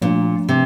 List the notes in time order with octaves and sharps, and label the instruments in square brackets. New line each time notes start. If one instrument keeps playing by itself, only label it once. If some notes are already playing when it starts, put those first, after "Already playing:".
[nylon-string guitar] A#2 [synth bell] F3 A3 D4
[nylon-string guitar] C3